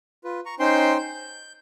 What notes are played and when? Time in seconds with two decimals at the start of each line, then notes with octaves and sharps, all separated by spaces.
0.24 F4 B4
0.46 A#5 C#6
0.60 C#4 D#4 C5 G5 C6
0.99 G6